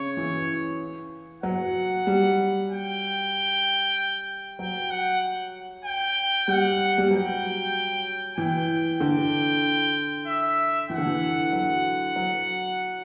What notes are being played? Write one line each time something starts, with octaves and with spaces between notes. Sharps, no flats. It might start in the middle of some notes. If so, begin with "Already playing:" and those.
Already playing: C#3 C#5
E3
F#3 F#5
G3
G5
F#3 G5
F#5
G5
G3 F#5
G3
F#3 G5
E3 G5
D3 G5
E5
E3 F#5
D3
E3
F#3
F#3